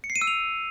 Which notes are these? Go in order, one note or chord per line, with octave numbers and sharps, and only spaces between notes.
C#7
C7
D#7
E6
F7